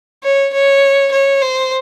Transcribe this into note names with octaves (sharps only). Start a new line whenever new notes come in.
C#5
C#5
C#5
C5